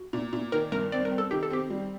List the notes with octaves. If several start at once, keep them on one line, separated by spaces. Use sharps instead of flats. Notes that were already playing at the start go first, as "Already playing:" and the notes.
Already playing: F#4
A#2
A#2
D#3 A#4
G2 A#4
C4 D5
A#4
C4
A4
D#3 G4
A4
C4 G4
G3